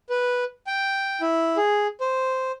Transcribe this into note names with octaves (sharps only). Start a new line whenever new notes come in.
B4
G5
E4
G#4
C5